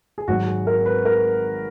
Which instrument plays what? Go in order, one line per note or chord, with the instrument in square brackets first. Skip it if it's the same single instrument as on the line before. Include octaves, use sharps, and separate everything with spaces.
[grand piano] G#4
G#1 G#2 F#3 F#4
G#4
A#4
B4
A#4